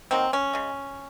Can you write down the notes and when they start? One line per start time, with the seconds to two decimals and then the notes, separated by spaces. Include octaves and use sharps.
0.11 D#3 F#3 A#3 C4
0.33 C#4
0.53 C#3 G#3